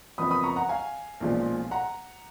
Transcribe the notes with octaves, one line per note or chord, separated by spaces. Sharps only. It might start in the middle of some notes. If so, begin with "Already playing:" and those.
F#1 F2 F3 B3 B5 D#6
B5 D#6
A#5 C#6
F#5 A#5
F5 G#5
B1 A#2 F3 G#3 C#4
F#5 A#5